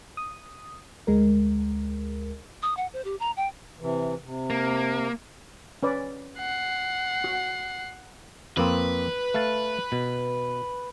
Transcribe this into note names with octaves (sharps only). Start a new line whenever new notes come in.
D#6
D2 G#3 A#4
D#6
F#5
C5
G4
A#5
G5
C3 E3
C3
A#3
C#4 B4 D5
F#5 C7
F#4
F2 A#3 C4 B4
A3 F5 A5
B2